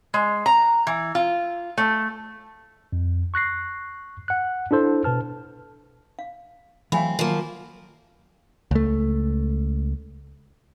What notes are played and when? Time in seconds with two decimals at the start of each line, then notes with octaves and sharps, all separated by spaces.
0.14 G#3
0.46 A#5
0.87 E3
1.15 F4
1.78 A3
2.93 F2
3.34 C#6 F#6 A#6 C7
4.28 F#5 F#6
4.71 D4 E4 A4 C5
5.04 B2 B4 A5 F6
6.19 F5
6.92 E3 F#3 A3 C4 F5 G#5 B5
7.19 D#3 F3 F#3 A#3
8.71 C#2 A3